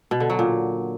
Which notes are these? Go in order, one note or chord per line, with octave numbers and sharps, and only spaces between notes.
B2
D3
F#3
A#2